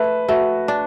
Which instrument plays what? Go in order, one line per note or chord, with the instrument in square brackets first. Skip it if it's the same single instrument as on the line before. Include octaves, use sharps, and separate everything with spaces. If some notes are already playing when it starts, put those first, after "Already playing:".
Already playing: [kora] A3 [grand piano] B4
[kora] A3 [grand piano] F#4
[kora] D4